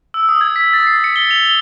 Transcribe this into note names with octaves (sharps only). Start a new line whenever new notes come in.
E6
D#6
G#6
B6
A6
C7
C#7
G7
F7
G7